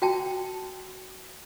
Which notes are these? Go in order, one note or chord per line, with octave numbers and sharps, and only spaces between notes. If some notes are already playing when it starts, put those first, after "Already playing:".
F#4 G5 A5